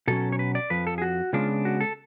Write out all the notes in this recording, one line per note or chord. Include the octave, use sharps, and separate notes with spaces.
B2 F#3 C#4 A4
C#5
B4
D5
F2 F3 B4
A4
G#4
F#4
C#3 G#3 B3 D4 F4
F#4
A4